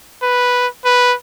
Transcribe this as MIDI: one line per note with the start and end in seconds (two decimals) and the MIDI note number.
0.22 0.67 71
0.85 1.14 71